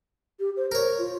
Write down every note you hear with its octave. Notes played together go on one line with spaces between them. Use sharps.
G4
C5
A#4 C5 C#5
F4